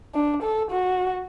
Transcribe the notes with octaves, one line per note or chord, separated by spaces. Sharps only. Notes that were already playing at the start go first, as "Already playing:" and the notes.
D4
A4
F#4